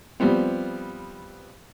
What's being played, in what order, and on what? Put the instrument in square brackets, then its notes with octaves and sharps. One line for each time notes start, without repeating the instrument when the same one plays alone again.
[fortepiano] F3 G3 B3 C4